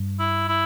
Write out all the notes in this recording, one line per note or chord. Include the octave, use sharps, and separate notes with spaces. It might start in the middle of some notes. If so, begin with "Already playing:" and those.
Already playing: G2
E4
E4